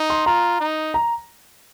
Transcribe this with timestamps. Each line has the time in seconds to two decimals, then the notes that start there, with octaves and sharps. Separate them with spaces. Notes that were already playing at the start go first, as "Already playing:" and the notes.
Already playing: D#4
0.10 C6
0.26 F4 A#5
0.61 D#4
0.94 A#5